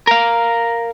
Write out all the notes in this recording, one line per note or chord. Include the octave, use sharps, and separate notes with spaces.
A#4 F5